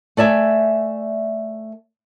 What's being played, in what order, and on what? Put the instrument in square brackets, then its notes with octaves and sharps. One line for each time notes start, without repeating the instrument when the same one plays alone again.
[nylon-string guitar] A3 D5 E5 G#5